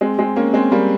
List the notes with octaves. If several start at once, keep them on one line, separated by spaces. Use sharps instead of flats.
G#3 C4
G#3 C4
A#3 C#4
G#3 C4
G3 A#3